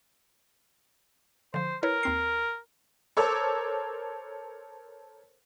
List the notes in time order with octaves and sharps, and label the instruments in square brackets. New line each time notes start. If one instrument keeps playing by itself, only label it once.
[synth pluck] D3 F3 [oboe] C5
[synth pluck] E4 B4 C#5 [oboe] A#4
[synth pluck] D#2 C4 C7
[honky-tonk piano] A4 A#4 C5 C#5 D6 E6